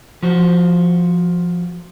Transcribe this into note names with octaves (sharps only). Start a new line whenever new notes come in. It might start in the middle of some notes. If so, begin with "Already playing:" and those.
F3 F#4 C5